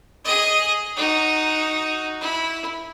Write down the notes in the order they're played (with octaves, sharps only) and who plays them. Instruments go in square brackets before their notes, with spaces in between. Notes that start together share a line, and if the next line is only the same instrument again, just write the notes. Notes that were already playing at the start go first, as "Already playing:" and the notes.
[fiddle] G#4 D#5
D#4 F#4
E4